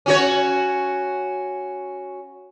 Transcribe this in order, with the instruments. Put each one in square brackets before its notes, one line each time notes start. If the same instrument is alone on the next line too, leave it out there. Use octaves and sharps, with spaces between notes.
[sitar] C#4 F#4 C#5